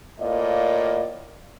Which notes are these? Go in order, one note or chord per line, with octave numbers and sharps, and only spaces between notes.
A2 A#3 F4 D5 D#5